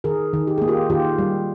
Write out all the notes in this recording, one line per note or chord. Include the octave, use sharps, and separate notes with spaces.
D#3 G#4 A#4
D#3
G4
A#3 G#4
F4 G4
D#3 F4 G4
G3